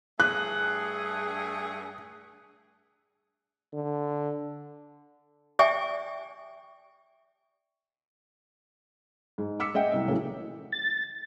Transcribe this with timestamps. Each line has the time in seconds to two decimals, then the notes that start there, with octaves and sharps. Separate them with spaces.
0.20 G2 A3 G#4 F#6
3.73 D3
5.59 D5 E5 G5 G#5 C#6
9.38 G#2
9.60 D6 E6 B6 C#7
9.74 G#3 G#4 D#5 E5 F#5 G5
9.93 C2
10.08 A2 C#3 E3 F#3 A3 A#3
10.72 A6